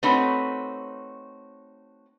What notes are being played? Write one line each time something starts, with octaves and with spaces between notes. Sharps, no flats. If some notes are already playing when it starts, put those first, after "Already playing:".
A3 C4 D#4 F#4 B4 C#5